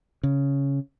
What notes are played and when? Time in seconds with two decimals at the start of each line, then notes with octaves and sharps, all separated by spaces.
0.23 C#3